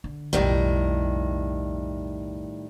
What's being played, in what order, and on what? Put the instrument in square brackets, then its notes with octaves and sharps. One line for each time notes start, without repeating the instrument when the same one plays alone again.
[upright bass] D3
[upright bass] B1 F2 [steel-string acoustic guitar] A2 D#3 G3